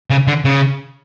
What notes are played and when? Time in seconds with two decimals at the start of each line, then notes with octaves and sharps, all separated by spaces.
0.10 C#3
0.27 D3
0.45 C#3